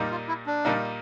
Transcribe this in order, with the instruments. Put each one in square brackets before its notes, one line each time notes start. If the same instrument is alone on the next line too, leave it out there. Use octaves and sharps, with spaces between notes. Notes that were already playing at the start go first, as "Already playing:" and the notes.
Already playing: [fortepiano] A#2 G3 A#3 D#4
[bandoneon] F4
E4
D4
[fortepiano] A#2 G3 A#3 D#4